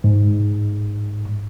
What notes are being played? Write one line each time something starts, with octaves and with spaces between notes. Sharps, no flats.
G#2